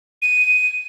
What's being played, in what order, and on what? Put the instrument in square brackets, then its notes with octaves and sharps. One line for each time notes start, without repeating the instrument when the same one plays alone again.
[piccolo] D#7